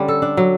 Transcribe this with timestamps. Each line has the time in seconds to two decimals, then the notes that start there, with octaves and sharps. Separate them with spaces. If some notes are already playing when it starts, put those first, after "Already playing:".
Already playing: D3 G3 C#4
0.08 A4
0.22 D4
0.37 F#3